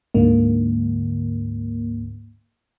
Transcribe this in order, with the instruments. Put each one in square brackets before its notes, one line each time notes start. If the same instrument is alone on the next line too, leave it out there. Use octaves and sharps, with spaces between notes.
[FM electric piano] D2 G#2 D3 A#3